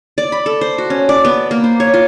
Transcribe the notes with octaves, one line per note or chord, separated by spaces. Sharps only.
D5
B5
A4
C5
F#4
C#4
D5
B3
A#3
C5
C#5
F4